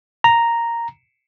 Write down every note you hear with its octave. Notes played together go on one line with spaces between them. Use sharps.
A#5